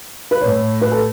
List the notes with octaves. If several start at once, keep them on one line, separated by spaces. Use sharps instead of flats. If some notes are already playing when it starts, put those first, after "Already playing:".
B4
A2 C#5
B4
A4